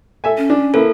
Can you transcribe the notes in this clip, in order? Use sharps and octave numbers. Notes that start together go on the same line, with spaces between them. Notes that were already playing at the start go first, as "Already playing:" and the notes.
A4 E5 G#5
C#4
D4
A#3 E4 A4 B4